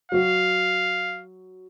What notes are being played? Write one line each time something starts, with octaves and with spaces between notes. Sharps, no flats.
F#3 F#4 F5